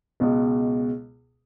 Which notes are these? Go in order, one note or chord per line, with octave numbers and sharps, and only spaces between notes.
C#2 B2 G#3